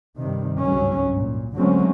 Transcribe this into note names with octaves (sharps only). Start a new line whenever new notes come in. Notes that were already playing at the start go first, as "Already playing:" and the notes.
G2 C3 D#3
G#1 C#2 G2 F#3 C#4
A#2
D3 F#3 G#3 A3 C4 C#4